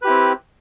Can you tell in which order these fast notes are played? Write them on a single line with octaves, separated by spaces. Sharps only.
B4 G4 E4 C4